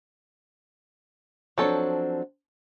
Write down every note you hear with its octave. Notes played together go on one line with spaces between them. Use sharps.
F3 F#3 C4 D4 A4 C#5